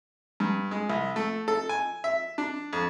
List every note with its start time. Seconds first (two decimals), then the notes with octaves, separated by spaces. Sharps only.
0.40 G2
0.71 G#3
0.90 C2
1.16 A3
1.48 A4
1.69 G#5
2.04 E5
2.38 D4
2.73 F2